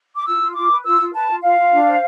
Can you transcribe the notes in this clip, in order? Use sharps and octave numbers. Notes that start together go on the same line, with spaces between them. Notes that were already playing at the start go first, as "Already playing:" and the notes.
D6
F4 E6
F4
F4 D6
B4
F4 E6
F4
B4 A5
F4
F4 F5
F4
D4
C5